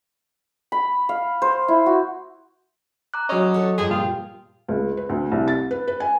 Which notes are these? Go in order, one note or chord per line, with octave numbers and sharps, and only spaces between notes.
B5
F5
C5
E4
F#4
A#5 D6 F#6
F#3 C#4 D#5 D#6
F#4 A4
G2 F3 G4 G#4
A#2 F4
C#2
B4
D2
C2
A6
B4
B4
G#5